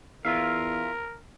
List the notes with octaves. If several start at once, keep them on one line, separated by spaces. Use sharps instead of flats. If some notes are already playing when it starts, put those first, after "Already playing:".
E2 F4 A#4 E5 F5